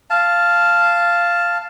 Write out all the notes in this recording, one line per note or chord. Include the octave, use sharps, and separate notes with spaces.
F5 A5